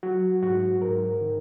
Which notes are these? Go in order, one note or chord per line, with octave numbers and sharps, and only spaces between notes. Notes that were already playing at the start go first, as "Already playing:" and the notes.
F#3 F#4
G#2 F#4
G#2 A#4
D#3